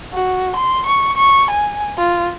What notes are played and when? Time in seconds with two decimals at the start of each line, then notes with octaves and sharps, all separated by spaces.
0.13 F#4
0.56 C6
0.86 C#6
1.17 C#6
1.51 G#5
1.98 F4